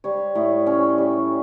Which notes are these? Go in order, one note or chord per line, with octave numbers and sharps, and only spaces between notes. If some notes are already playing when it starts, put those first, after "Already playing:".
G3 C#5
A2
C#4
G3